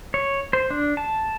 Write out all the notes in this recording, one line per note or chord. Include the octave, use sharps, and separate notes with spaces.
C#5
C5
D4
A5